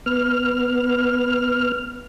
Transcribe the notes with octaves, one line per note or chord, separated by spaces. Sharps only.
B3 F6